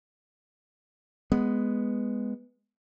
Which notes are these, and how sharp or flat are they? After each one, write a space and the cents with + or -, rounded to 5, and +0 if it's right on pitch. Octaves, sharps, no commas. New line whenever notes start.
G#3 +0 B3 +0